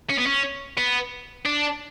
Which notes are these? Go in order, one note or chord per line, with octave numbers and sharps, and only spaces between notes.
C#4
B3
C#4
B3
D4